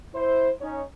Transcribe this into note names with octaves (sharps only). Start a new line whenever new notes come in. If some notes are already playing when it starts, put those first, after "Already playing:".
E4 C5
C#4 D#4 C#5